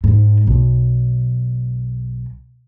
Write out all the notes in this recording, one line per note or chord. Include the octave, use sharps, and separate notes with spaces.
G#2
B1